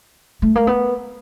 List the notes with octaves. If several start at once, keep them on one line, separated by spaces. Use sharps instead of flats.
A3
A#3
B3